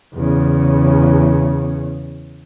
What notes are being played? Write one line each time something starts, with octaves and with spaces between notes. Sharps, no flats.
E2 C#3